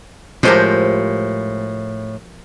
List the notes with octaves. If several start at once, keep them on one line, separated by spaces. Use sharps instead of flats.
A2 F3 G#3 G4 A#4 C5